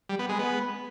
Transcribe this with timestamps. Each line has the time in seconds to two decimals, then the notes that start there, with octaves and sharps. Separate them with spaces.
0.09 G3
0.19 B3
0.29 G#3
0.39 B3